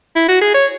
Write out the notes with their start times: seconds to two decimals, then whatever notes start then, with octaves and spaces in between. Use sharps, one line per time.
0.16 E4
0.29 F#4
0.42 G#4
0.54 C#5